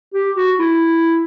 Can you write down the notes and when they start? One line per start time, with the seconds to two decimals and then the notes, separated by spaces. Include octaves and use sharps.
0.14 G4
0.37 F#4
0.59 E4